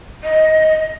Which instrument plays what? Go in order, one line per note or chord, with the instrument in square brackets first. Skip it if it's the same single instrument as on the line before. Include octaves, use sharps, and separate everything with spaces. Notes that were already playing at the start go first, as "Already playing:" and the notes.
[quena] D#5